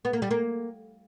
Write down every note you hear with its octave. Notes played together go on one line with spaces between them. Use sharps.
B3
A#3
G3
A#3